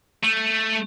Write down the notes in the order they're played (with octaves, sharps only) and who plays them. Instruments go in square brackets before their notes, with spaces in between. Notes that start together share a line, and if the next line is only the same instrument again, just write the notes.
[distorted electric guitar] A3